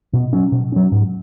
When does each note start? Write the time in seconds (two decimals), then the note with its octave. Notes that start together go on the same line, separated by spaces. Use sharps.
0.13 B2
0.33 F#3 C#4
0.52 B2
0.72 F#3 C#4
0.92 G#2